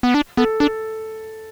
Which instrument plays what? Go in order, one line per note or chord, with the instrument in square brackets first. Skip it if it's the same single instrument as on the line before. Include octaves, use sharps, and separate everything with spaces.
[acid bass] B3
D4
[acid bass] B3 [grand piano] A4
[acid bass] D4 [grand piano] A4